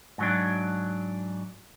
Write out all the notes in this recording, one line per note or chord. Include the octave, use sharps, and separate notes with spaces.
G#2 F#3 D4